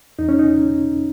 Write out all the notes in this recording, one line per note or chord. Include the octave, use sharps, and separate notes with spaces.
E2 D#4
C#4
D#4